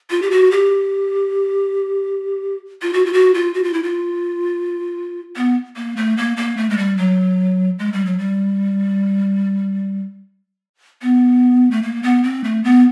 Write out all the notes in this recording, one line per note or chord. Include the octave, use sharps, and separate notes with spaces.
F4
G4
F#4
G4
F4
F#4
F4
F#4
F4
F#4
F4
E4
F4
B3
A#3
A3
A#3
A#3
A3
G#3
G3
F#3
G#3
G3
F#3
G3
B3
A3
A#3
B3
C4
A3
B3